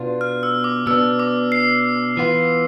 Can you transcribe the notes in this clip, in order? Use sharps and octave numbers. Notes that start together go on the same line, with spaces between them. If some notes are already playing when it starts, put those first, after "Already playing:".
Already playing: B2 B3 D4 F4
F6
E6
D6
B2 B3 D4 E6
D6
C7
E3 B3 F4